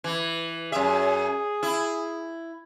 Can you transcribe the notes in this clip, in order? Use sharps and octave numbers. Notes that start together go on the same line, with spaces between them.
E3
F#2 G#4 E5
E4